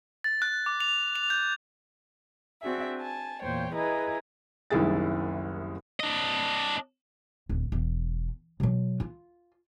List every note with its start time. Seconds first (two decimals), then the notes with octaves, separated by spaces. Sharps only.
0.24 A6
0.42 F#6
0.66 D6
0.80 F7
1.16 F7
1.30 G6
2.61 C4 D4 F#4 G#4 E5
2.97 G#5 A5
3.42 E2 A#2 C5 C#5 G5
3.74 E4 G#4 B4 D#5 A#5
4.70 F#1 C2 D#3 E4 G#4 A6
6.00 D4 D#5
7.49 D1
7.72 E1
8.60 B2 F#3
9.00 F4